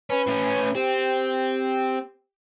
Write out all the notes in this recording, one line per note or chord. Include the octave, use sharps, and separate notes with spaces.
C#4 B4
A2 C#4
C4 G4